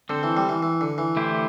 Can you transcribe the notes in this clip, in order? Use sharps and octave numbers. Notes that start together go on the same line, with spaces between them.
D3 C4 A4 C5
E3
G3
E3
E3
D3
E3
D3 A3 E4 G4 C5